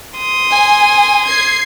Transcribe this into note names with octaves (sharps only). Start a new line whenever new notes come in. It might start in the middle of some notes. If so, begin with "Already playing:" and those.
C6 D#6
G#5
G#6 C7